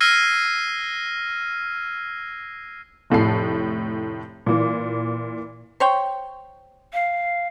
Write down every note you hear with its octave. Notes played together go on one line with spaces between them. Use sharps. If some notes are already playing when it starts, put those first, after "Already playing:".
E6 F6 G#6 A#6 C7 D#7
F1 A2 A4 C7
A#2 E3
C5 C#5 G5
F5